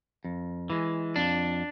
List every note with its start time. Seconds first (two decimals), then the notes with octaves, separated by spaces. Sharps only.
0.24 F2
0.70 E3 G#3
1.16 F2 D4